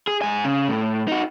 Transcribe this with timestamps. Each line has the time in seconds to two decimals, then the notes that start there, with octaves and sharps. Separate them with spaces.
0.07 G#4
0.22 G#2 G#5
0.44 C#3
0.68 A2
1.08 D#4 F#4